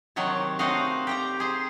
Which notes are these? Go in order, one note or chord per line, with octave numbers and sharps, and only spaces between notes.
C3 D#3 F#3 C#5 A5
A3 C4 D#4 F#4 D#5 F5
G4 G5 A#5
G#4 C5